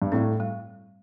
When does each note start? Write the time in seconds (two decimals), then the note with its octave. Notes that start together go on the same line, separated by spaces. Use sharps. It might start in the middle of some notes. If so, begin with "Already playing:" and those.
0.02 G2
0.12 A2 C4
0.40 G3